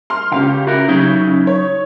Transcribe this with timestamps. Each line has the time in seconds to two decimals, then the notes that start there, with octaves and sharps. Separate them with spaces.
0.10 C6 F6
0.32 C#2 C#3 G4 F5
0.67 E4 F#4 A#4
0.89 C#3 F#3 D#4 E4
1.47 C#5